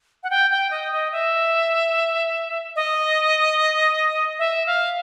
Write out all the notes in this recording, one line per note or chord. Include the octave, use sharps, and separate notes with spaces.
F#5
G5
G5
D#5
D#5
E5
D#5
E5
F5